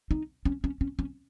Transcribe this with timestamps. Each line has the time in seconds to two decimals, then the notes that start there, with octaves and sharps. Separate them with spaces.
0.11 D#4
0.45 C#4
0.64 C#4
0.81 C#4
0.99 C#4